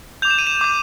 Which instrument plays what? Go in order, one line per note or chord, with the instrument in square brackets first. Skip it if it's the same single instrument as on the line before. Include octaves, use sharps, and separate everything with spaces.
[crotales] D6 G6 F7
E7
D#7
E7
D6 G6